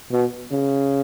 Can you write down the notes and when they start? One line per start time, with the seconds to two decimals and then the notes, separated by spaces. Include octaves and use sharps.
0.12 B2
0.51 C#3